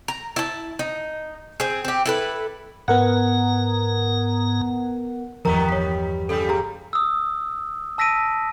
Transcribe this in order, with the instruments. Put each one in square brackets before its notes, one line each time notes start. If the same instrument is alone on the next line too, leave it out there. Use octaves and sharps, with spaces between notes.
[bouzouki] A#5
E4 A5
D#4
C4 G#4
C4 G4
E4 A4 B4
[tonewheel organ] G#2 A#5 [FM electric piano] B3 A#4 F#5
[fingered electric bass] G1 E2 F3 [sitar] D#3 G3 B3 [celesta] A#4 A#5
[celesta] C#5 B6
[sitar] C#3 G3 [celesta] A4
[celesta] G4 G#4 A#5
[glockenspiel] D#6 E6
A5 E6 A#6 B6 D7 D#7